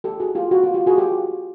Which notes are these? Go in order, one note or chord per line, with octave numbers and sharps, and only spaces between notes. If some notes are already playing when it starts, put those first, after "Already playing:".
G4 A4
F#4 G#4
F4 G4
F#4
F4
F4 G4
F#4 G#4
F4 G4